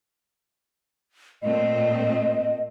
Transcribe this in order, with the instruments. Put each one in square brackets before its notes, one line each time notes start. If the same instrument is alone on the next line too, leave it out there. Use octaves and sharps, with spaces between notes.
[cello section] A#2 A3 C4 [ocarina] D#5